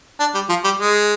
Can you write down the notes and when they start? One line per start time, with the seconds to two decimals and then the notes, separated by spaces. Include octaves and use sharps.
0.20 D4
0.34 G3
0.49 F3
0.64 G3
0.80 G#3